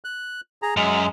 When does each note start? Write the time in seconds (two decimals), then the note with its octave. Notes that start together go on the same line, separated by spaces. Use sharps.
0.05 F#6
0.62 G#4 A#5
0.77 F#2 G#3